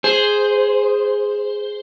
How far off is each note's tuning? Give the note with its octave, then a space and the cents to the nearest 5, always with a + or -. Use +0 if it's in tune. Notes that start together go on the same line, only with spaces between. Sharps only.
G#4 +0 C5 +0